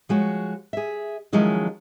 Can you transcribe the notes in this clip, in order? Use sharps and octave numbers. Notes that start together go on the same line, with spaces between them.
F3 G#3 F#4 C#5
G#4 E5
D#3 F3 F#3 G#3 C#4 E4